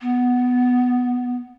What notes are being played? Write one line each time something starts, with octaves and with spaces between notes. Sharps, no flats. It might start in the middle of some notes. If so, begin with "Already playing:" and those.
B3